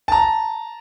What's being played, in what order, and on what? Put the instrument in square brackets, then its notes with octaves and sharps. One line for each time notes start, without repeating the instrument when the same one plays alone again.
[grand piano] A5 A#5